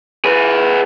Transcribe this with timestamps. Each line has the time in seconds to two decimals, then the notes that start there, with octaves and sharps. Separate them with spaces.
0.25 G#4 B4